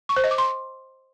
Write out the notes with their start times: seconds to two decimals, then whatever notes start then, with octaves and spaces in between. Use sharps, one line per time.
0.09 C#6
0.16 C5
0.24 D#5
0.31 D6
0.38 C6